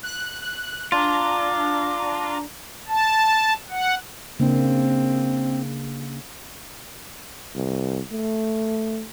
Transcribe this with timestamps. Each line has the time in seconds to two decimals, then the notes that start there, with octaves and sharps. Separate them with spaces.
0.03 F#6
0.92 D4 F4 A#5 D6
2.88 A5
3.70 F#5
4.39 C#3 A#3 C4 D4
7.55 C2
8.12 A3